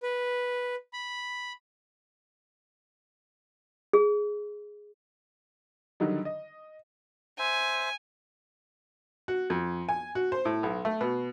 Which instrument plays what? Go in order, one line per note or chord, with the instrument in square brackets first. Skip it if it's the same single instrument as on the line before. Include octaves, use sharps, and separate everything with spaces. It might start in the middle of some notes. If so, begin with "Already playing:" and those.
[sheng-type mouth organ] B4
B5
[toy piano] G#4
[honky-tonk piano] D3 D#3 F#3 G3 D#4
D#5
[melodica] C5 E5 [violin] G#5
[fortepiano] F#4
F2
G#5
F#4
C5
A2
B1
A3
B2